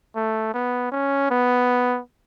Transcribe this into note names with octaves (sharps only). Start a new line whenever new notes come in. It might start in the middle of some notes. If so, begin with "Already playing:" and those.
A3
B3
C#4
B3